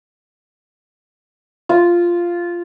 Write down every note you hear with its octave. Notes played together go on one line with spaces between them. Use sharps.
F4